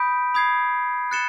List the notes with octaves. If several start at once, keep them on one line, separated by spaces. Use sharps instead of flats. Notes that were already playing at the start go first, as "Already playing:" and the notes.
Already playing: B5 D#6 G6 B6 D7
B5 D#6 G#6 C7
F#6 A6 C#7 E7 G7